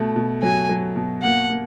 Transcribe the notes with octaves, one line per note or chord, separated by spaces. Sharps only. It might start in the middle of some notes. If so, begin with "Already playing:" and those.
Already playing: B2 A3
B2
F#3 G#5
F#3
B2
A#3 F#5
A#3